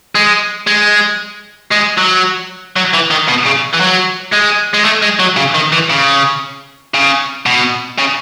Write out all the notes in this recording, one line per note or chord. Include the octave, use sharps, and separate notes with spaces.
G#3
G#3
G#3
F#3
F#3
E3
D#3
B2
C#3
E3
F#3
G#3
G#3
A3
G#3
F#3
C#3
D#3
E3
C#3
C#3
B2
C#3